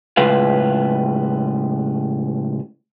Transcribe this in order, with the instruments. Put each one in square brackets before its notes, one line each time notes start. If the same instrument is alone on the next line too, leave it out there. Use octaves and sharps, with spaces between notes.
[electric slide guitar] A2 C#3 G#3 F4 B4 F5